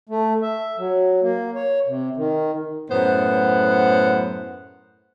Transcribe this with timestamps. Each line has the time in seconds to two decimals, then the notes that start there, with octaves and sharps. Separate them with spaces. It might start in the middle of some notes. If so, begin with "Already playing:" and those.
0.09 A3
0.42 E5
0.78 F#3
1.22 A#3
1.55 C#5
1.86 C3
2.17 D#3
2.91 F#2 A2 B3 C5 F#5